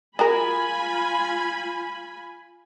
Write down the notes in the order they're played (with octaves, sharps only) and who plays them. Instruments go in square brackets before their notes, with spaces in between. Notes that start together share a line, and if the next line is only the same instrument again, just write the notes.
[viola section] F4 G#5 B5 [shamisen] F#4 G#4 A#4